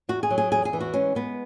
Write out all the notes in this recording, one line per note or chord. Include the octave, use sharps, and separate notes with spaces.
E2 F#4
G#4
F#3
G#4
E2 G#4
G#4
E3
F#4
G#3 C#4
G#3 B3